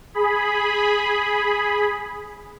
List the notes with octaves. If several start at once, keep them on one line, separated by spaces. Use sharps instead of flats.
G#4 B5